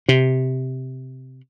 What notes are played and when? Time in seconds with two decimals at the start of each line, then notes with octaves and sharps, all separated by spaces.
0.09 C3